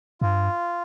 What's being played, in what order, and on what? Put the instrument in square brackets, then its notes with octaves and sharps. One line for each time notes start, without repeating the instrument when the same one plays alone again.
[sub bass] G2 [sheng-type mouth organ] F4